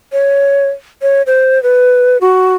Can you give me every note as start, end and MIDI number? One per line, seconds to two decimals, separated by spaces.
0.12 0.67 73
1.02 1.22 73
1.27 1.62 72
1.63 2.18 71
2.21 2.55 66